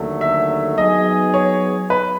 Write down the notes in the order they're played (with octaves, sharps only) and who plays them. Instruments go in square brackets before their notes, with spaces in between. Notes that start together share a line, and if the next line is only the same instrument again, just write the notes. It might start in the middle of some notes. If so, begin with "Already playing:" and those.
Already playing: [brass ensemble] D#2 D3 F#3 A3
[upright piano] E5
[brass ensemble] F#3 B3 D#4 G#4 [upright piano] D#5
[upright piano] C#5
B4